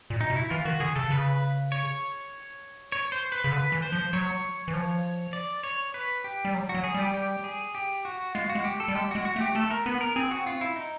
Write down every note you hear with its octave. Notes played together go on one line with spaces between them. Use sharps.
A#2
D#4
B2
E4
E3 F4
D#3 F#4
D3 G#4
C#3 A4
C#3 B4
C#5
C#5
C5
B4
C#3
D3 B4
E3
C5
F3
F#3 C#5
E3
F3
D5
C#5
B4
G4
G3
F#3
F#4
F#3
G#4
G3
G4
G4
G#4
G4
F#4
G#3 F4
F#4
G#3
G4
A4
G3
G#3 G4
G#3 F#4
F#4
A3
G4
A3 A4
A#4
B3 B4
A#4
C4 G#4
F#4
F4
E4
D#4